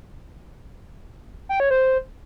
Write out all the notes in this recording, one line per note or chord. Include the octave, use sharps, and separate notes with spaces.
G5
C#5
C5